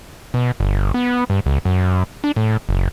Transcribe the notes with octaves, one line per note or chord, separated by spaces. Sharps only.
B2
G1
B3
G2
C#2
F#2
D4
A2
F#1